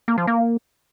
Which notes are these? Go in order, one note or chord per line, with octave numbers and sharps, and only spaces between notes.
A#3
F3
A#3